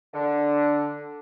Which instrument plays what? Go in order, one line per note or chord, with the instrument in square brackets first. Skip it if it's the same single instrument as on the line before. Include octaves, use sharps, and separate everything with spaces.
[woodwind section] D3